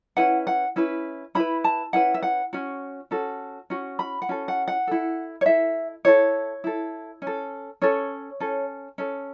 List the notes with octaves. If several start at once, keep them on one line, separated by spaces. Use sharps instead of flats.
C#4 E4 B4 F#5
F#5
C#4 E4 B4
C#4 E4 B4 B5
A5
C#4 E4 B4 F#5
E5
F#5
C#4 F#4
C#4 F#4 A4
C#4 F#4
B5
F#5
C#4 F#4 A4
F#5
F#5
E4 A4
C#5
E4 A4 E5
E4 A4 C#5
E4 A4
C#4
A4
C#4 A4 C#5
C#4 A4
C#4 A4